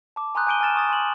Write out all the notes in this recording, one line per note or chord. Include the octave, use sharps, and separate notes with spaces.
A5 D6
G#5 A#5 C6 D#6 F#6 G6
G#5 D6 G6 D7 D#7 G7
G#5 F6 A6 E7
C#6 D#6 A6
G#5 C6 F#7